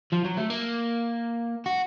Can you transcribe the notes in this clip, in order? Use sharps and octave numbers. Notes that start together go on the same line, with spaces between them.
F3
F#3
A3
A#3
F#4